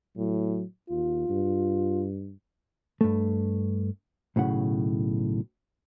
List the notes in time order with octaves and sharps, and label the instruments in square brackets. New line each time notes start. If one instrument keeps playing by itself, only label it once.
[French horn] A2 [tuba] F#3
[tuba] D#2 [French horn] F4
[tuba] G2
[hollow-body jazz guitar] G2 A3
B1 A2 C#3 F#5